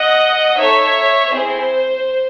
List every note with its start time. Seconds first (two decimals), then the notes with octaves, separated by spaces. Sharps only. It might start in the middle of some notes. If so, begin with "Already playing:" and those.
Already playing: D#5 F#5
0.57 D#4 A4 C#5 E5
1.31 C4 E4 G#4 C5